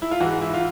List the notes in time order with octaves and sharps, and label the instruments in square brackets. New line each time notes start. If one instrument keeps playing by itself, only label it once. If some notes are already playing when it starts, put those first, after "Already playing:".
[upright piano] E4
F4
G#2 E3 F#4
E4
F4